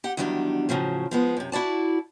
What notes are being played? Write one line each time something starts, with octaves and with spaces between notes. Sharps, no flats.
G4 F#5
E2 D#3 F#3 G3 C#4 D4
A2 C#3 F3 F#3
F3 G#3 B3
F#2 C3
E4 F#4 D5 A5